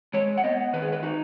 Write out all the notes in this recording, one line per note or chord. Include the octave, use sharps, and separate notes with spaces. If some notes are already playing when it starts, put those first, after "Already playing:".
G#3 C#5
F#5
B3 D#5
D#3 B4
G#4
B4
D#4 F#4